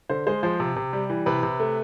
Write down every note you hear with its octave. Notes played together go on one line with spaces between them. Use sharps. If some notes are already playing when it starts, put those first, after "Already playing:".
D3 C5
G#3 C5
F3 C5
C3
C3
G3
E3
C3 B4
C3
A3